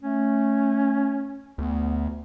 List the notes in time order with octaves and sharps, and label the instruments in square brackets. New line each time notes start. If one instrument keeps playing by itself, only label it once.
[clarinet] A3 [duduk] C#4
[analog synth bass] D2 [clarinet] B3